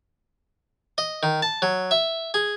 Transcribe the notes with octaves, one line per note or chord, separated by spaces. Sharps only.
D#5
D#3
A5
F#3
E5
G#4